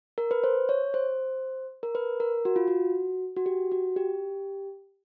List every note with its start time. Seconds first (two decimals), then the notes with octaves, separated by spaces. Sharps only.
0.18 A#4
0.31 B4
0.44 C5
0.69 C#5
0.94 C5
1.83 A#4
1.95 B4
2.20 A#4
2.45 F#4
2.56 F4
2.68 F#4
3.36 F#4
3.46 G4
3.72 F#4
3.96 G4